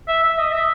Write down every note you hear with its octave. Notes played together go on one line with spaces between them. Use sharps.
E5
E5
D#5
E5